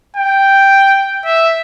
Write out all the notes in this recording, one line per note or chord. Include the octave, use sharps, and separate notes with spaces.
G5
E5